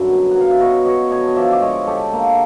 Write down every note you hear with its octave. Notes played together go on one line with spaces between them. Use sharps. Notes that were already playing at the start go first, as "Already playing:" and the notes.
Already playing: F#2 D3 G3 E5 F#5
B2
F#3 F#5
F5
E5
B3 C#5 D#5
B2 C#5 D#5
D3 C#5 D#5
D#5
F3 D5 E5
D5
G#3 C#5 D#5
D3 G4 A4
A#3